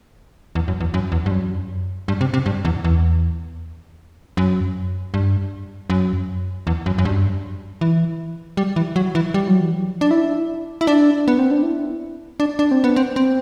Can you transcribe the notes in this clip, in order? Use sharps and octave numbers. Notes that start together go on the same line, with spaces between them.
E2
F#2
E2
F#2
E2
G2
F#2
G2
C3
C3
G2
E2
E2
F#2
G2
F#2
E2
F#2
F#2
G2
E3
G3
E3
F#3
E3
G3
F#3
E3
F#3
D4
E4
E4
D4
B3
C4
D4
E4
D4
D4
C4
B3
C4
C4